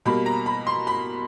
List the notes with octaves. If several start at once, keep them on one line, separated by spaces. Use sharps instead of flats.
B2 G3 A#3 B5
A#5
B5
C6
B5